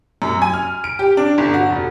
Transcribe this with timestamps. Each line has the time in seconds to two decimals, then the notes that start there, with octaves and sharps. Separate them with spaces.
0.22 F#2
0.42 G#5
0.54 F6
0.84 D7
0.99 G4
1.17 D4
1.38 G1
1.54 F#4
1.70 F1